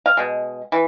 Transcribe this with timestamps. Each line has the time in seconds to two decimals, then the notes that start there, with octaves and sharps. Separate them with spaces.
0.06 F5
0.17 B2 G#3
0.72 E3